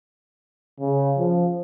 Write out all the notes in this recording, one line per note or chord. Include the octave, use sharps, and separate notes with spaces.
C#3
F3